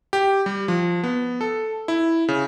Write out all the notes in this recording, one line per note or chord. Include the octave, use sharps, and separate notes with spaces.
G4
G3
F3
B3
A4
E4
C#3